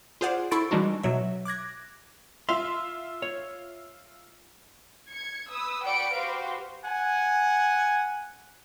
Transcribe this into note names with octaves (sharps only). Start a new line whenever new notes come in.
F4 G#4 C5 D5 F#5
E4 A4 C6 C#6 A6 D7
E3 G3 G#3 D4 D#4 F#4
B2 F#3 E5
D6 F#6 G#6 A#6
F4 E5 C6 F7
C#5
G#6 C#7
B4 D#6 E6
F#4 B4 D5 G5 C#7 D7
F#4 G4 B4 C5 F5
F#5 G#5